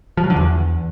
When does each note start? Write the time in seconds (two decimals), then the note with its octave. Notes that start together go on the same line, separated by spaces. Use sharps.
0.17 F3
0.24 F#3
0.30 D3
0.36 E2